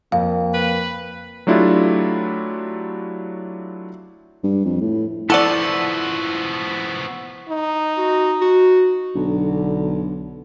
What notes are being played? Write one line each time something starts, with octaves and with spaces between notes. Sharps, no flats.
F2 A#3 F5
B4
F#3 A3 D4 E4 F4 G4
G2
F2
A2
F3 B3 E4 A4 D5 F#5 C#6 E6
D#4
F#4
F#4
B1 D3 D4